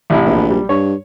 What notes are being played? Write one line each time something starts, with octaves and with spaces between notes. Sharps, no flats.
A1 C3 E4
A#1
G3
G2 C#5